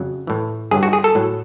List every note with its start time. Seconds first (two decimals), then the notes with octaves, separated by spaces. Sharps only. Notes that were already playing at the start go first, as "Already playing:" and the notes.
Already playing: F2 C#3 F#3
0.27 A2 E3
0.71 G2 D3 F#3 G#4
0.83 F#4
0.93 G#4
1.04 A4
1.15 A2 F#3